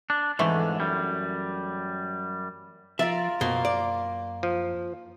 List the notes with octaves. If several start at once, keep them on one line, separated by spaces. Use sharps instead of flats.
D4
F2 G#2 D3 E3 A3
F#2 G3
F3 F4 A#4 D5 E5
F#2 B2 A#3 C5 C6
D5
F3